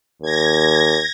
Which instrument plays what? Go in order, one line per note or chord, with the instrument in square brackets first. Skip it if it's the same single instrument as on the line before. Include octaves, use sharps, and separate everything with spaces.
[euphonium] D#2 [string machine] G#6 A#6